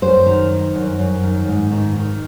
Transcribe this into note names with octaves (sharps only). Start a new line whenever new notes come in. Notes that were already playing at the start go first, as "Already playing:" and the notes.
F#2 C5
D#3
D#3
F#2
F#2
D#3
G#2
D#3
D#3